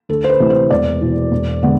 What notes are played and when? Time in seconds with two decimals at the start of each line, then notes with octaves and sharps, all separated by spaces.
0.09 D2 A4
0.24 C5
0.29 B4
0.40 C3 E3 A3
0.50 C5
0.70 E1 D5
1.01 E2 B2
1.32 E1
1.63 D3 G#3 B3